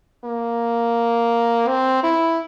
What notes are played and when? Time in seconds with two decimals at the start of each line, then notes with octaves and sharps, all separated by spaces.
0.25 A#3
1.68 C4
2.03 E4